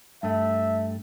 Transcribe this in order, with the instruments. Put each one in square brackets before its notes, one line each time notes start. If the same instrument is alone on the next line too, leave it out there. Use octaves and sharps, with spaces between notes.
[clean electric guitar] G2 A3 [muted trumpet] E5